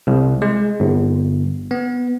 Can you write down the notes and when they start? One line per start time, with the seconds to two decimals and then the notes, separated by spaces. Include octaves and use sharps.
0.07 C2
0.42 G#3
0.80 G1
1.71 B3